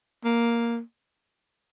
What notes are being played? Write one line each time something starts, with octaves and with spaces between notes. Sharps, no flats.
A#3